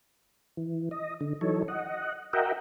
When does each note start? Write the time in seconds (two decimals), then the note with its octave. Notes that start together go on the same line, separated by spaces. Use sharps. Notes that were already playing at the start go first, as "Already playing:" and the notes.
0.57 E3
0.91 D#5
1.21 D3
1.41 E3 F#3 D#4 A4 C#5
1.68 D#5 F#5
2.33 F#4 A#4 D#5 E5 F#5 G5